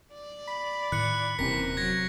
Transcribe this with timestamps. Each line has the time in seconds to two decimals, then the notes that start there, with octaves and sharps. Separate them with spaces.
0.14 D5
0.48 B5
0.92 A2 D#3 F#6 C#7
1.39 D#1 C3 E3 C4 C#4 A#4 B6
1.77 F#3 G#6 A#6